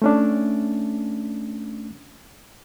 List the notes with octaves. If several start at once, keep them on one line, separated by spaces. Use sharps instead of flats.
A3 C#4 D4